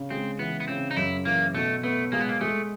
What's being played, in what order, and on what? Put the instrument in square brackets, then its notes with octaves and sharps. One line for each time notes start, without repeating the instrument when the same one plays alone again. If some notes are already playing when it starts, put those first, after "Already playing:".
Already playing: [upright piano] C#3
[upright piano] G#3 [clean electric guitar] C4
[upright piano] E3 [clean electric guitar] B3
[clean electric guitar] B3
[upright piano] C#3 [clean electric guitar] C4
[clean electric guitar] D#4
[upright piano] F#2 [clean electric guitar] E4
[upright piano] E3 [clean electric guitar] A#3
[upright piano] B2 [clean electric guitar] A3
[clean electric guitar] A3 [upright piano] B3
[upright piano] G#3 [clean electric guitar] A#3
[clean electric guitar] B3
A#3
[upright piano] G#3 [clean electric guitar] A3